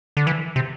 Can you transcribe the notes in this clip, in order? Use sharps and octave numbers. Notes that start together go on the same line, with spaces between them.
D3
E3
C3